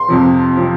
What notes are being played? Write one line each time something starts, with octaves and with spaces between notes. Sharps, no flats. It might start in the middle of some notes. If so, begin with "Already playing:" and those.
Already playing: C6
F2 C3 F3
C3 F3